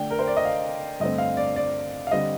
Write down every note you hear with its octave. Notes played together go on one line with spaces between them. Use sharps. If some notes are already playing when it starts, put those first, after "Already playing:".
Already playing: D3 A3 D4 G5
A#4
C5
D5
D#5
F5
G2 D3 A3 C4 D#5
F5
D5
D5
F5
D3 G3 C4 D#5